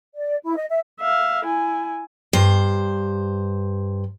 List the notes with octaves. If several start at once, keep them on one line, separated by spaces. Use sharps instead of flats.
D5
E4
D#5
E5
E5 F5
E4 G#5
G2 C5